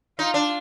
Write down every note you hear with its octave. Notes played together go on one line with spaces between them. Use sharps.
D#4 F4
D4